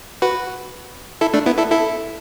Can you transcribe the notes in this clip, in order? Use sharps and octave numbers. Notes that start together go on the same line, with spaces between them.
F#4 B4
E4 A4
A3 D4
B3 E4
E4 A4
E4 A4